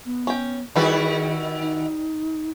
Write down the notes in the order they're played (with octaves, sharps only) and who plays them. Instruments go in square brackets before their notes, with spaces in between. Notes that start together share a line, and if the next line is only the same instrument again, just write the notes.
[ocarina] B3
[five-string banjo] C#4 G5
[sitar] D#3 E4 F#4 [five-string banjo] G3 B4 D5 [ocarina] G#4
[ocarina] D#4